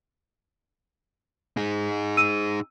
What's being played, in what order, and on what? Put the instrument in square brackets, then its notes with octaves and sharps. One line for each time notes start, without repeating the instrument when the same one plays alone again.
[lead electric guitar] D#4 G#4
[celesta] E6 D#7